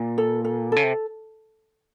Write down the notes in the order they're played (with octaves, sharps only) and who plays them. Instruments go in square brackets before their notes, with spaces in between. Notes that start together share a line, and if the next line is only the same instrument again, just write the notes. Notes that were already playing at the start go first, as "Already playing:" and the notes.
Already playing: [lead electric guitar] A#2
[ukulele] A4
A4
[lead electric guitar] C#3 [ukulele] A4
[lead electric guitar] C3